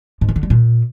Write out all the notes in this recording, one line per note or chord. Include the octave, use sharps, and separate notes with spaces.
G#2
D#3
D3
G3
A#2